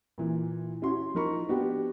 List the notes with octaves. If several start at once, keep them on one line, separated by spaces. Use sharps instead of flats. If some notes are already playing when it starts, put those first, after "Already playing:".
A#2 E3
C#4 E4 F#4 C6
F3 D#4 A#4 B5 C#6
B3 D4 F#4 G4